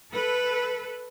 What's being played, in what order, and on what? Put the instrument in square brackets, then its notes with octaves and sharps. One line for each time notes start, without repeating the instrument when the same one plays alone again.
[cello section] A4 B4